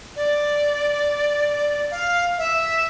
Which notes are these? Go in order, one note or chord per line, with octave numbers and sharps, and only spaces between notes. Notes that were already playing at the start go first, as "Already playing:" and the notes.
D5
F5
E5